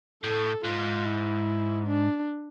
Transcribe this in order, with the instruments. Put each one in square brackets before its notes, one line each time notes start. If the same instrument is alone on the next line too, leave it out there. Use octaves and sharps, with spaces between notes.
[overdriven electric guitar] A2 [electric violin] A4
[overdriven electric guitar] G#2 [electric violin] F4
[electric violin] E4
D4